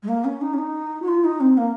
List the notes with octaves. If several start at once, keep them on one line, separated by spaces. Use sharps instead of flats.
G#3
A#3
C#4
D#4
C#4
D#4
F#4
F4
D#4
C4
A#3